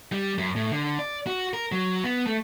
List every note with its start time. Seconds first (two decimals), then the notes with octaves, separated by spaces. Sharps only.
0.12 G3
0.38 F#2
0.56 A2
0.72 D3
0.99 D5
1.27 F#4
1.54 A#4
1.72 F#3
2.04 B3
2.27 A3